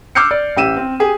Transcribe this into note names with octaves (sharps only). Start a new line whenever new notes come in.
D6 E6 F6 G6 C7 C#7
D5
A1 G4 E6 D#7 E7
C4
G4 G#4